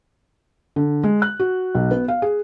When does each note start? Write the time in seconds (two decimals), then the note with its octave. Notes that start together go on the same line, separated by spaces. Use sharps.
0.76 D3
1.03 G#3
1.22 F#6
1.40 F#4
1.75 B1
1.91 B3
2.08 F5
2.22 G#4